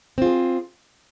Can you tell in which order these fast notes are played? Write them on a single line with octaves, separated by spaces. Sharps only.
C4 F4 G#4